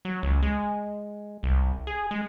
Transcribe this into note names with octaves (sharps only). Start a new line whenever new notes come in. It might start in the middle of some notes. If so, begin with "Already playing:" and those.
F#3
C#2
G#3
C2
G#4
G#3